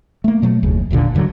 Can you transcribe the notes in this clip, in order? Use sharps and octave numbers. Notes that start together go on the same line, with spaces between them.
A3 A#3
B2 F#3 A3
F#1 D#2 C#3
G#1 D#2 A#2 D3
G#2 D3 D#3 F#3